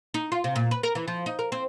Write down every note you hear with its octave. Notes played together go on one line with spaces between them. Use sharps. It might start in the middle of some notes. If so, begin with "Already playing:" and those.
D#4
F4
C3
A#2
B4
A#4
E3
F3
D#4
A#4
C4